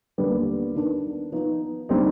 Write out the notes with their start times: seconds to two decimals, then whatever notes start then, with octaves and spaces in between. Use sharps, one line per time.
0.18 D#2 D3 G3 B3
0.75 D#3 B3 D4
1.32 F3 B3 D#4
1.89 D3 G3 C4 D#4